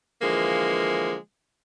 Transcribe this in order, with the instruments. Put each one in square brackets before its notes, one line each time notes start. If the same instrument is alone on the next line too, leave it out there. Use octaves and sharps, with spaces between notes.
[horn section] D3 E3 F3 G#3 A#3